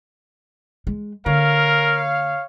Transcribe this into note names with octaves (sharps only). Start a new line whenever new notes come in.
G#3
D3 A#3 A#4 C#5 F5